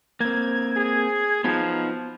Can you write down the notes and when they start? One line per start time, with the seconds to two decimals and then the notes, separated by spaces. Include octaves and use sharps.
0.20 A#3 C4 G#6
0.77 G#4
1.44 F3 B3 D#4 F#4